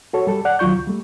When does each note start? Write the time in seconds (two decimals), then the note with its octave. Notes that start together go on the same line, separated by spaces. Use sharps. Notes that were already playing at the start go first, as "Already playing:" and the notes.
0.13 F#4 A4 C#5
0.27 G3 A4
0.45 D5 F#5 F#6
0.59 D2 D#3 F#3 F4 C#6 G6
0.72 C#2
0.87 G3 A3